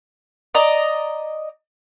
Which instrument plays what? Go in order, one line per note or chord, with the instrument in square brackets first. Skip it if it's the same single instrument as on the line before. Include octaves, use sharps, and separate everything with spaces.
[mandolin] D5 D#5 A#5